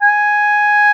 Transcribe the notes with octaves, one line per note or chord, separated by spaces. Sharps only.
G#5